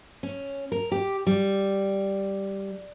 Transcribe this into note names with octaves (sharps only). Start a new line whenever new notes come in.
C#4
A#4
G4
G3